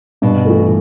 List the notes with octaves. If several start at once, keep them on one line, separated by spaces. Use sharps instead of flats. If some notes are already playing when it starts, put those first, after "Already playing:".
G2 B2
E3 A3